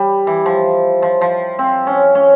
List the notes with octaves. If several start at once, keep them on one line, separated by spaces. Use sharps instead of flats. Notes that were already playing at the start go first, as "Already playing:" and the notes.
Already playing: G3
E3
F3
F3
F3
C4
C#4
C#4